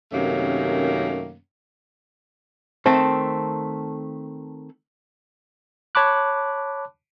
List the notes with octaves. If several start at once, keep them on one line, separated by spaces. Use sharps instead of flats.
F#2 C3 D#3 A3 A#3 C#4
D#3 A3 C4 A4
C#5 A5 B5 D6 F#6